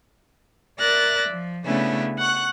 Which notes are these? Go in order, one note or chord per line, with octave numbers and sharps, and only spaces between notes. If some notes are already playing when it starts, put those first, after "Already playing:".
A#4 D5 E5 F#6 A6 A#6
F3
C#3 A3 B3 C#4 D4 E4
F#5 C#6 F#6